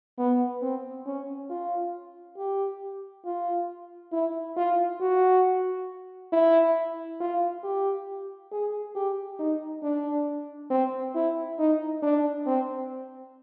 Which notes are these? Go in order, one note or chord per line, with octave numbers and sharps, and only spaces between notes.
B3
C4
C#4
F4
G4
F4
E4
F4
F#4
E4
F4
G4
G#4
G4
D#4
D4
C4
E4
D#4
D4
C4